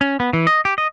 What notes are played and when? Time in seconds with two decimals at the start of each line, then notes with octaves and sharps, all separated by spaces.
0.01 C#4
0.20 B3
0.33 E3
0.47 D#5
0.65 G4
0.78 D#5